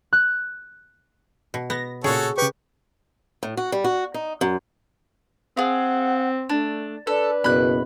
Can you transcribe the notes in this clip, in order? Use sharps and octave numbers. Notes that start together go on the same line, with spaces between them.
F#6
B2
B3 A#6
A#2 C#3 F#4 G#4 A4 C#5
C#3 G4 B4 C#6
A2
F#4
G3
F#4
D#4
F#2
C4 G#4 F5 F#5
A3 D4
D4 A4 B4
F#1 B2 B5 F#6